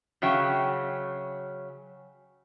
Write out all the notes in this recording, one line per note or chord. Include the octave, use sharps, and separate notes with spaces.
C#3 F#3 E5 G5